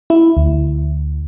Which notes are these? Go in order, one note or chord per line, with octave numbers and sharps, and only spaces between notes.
E4
D2